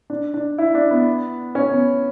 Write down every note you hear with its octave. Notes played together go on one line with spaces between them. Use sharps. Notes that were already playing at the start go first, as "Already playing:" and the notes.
D4
D4
E4
D4
B3
C#4
B3